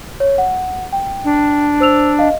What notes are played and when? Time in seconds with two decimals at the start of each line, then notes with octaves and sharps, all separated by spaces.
0.20 C#5
0.38 F#5
0.93 G5
1.25 D4
1.80 C5 E6 F7
2.19 D#5 F5